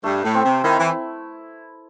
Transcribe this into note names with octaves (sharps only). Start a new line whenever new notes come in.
G2 A3
A2
C4
C3
D#3 E4
E3